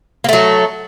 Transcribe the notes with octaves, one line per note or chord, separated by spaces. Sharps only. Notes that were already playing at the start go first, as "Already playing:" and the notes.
F#3 A3 A#3